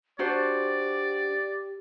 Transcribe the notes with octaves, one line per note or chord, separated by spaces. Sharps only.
D4 F#4 G4 C5 D5